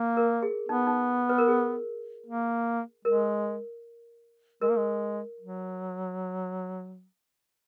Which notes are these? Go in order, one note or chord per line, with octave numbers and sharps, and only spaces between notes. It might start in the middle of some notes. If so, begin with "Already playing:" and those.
Already playing: A#3
A#4
G#4
B3 D#4
D#4
B4
A#4
G#4
A#3
G#3 A#4
G#3 A#4
A#3
G#3
F#3